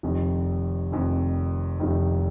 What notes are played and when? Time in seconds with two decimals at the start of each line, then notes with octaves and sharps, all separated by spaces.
0.03 F1 F2 D#3
0.92 F1 F2 D#3
1.80 F1 F2 D#3